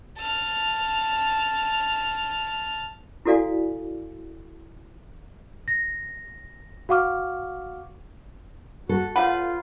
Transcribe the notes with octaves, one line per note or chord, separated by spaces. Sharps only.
A5 F6
E4 F#4 A4 D5 F5 G#5
A#6
F#4 F5 F#5 C#6 D6 F6
F#4 A4
F4 B4 C#5 F5 F#5